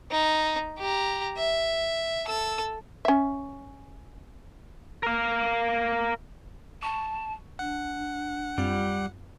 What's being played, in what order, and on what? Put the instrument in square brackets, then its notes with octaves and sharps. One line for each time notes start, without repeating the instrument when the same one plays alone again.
[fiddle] D#4
G4 A#5
E5
A4 E6
[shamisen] C#4 E5
[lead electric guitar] A#4 F5
[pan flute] A5 [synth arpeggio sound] C#6
[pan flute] D4 [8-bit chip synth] F#5
[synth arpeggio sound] F#2 C4 F4 [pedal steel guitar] G3